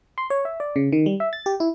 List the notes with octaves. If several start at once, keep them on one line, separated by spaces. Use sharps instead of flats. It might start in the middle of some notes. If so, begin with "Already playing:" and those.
C6
C#5
E5
D5
C#3
D#3
G3
E5
A6
G4
E4